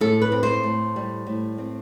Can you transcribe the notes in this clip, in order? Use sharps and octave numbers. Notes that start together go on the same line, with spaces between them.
A2 A4
B4
C4
C5
A2
G3
A2
C4